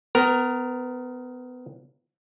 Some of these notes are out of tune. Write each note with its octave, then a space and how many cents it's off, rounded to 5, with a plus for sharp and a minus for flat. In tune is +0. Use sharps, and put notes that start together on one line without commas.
B3 +25 A#4 +0